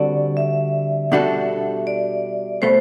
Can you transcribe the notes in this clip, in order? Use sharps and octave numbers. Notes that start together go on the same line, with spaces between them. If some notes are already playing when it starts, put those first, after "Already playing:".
Already playing: D3 G3 C4 F#4 A4 D5
E5
B2 G3 D4 F#4 A4
D5
B2 A3 C5